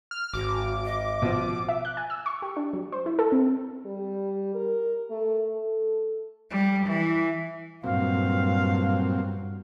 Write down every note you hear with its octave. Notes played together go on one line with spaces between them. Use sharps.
F6
G#1 F#4 D6
D#5
B2 F3
E5
F#6
G#5
E6
C#6
G4
D4
F#3
C5
E4
A4
C4
G3
A#4
A3
A4
G3
E3
G2 A#2 F#3 C4 F5